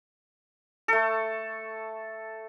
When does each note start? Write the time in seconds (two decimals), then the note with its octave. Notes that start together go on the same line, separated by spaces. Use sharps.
0.88 A3 A4